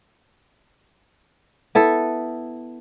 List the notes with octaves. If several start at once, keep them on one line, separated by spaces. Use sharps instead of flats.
B3 E4 A4